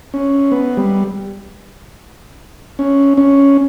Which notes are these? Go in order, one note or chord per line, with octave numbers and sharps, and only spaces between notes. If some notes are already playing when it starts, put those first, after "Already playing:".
C#4
B3
G3
C#4
C#4